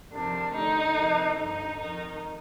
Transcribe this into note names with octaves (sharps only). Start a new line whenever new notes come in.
F2 C3 D#3 D4
D2 D3 D#4
F2 C3 D#3
G2 D3 D#4
F2 D#3 D#4